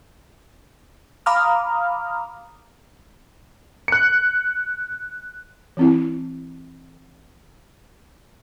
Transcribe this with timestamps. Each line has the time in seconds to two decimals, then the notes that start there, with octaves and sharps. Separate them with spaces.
1.26 F5 A#5 B5 D6 D#6 F6
3.88 F#6 C#7
5.77 E3 C4 E4